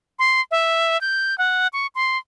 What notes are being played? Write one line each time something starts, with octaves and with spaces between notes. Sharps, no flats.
C6
E5
G6
F#5
C#6
C6